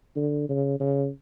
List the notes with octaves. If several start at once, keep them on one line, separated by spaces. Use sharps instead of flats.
D3
C#3
C#3